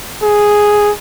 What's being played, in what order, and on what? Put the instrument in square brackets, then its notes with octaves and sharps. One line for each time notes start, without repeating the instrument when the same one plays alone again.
[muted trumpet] G#4